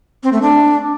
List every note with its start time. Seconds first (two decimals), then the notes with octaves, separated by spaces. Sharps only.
0.23 C4
0.33 A3
0.42 D4